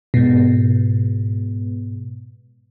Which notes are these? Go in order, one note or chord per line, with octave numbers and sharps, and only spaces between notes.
G#2 B2